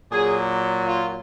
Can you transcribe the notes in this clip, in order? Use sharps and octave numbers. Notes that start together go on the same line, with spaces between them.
A#2 F#3 G#4
F4